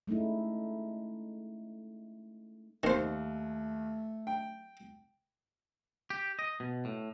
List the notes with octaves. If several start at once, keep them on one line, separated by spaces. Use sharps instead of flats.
G#3 A3 C#4 D#4 E4
D#2 D#3 A3 C5
G5
G4
D#5
B2
A2